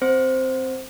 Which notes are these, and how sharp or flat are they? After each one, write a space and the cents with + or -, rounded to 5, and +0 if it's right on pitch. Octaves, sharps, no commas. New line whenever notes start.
C4 +0 C5 +0